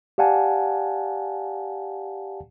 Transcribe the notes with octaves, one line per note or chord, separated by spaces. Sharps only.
G4 D5 F5 F#5 G#5 A5